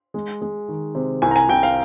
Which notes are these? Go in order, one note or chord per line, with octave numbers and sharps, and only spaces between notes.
G#3
G#3
D#3
C3
C2 G#5
A#5
G#5
C2 G5
F5